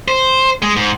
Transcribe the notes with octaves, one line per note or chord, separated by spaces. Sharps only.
C5
G#3
G#2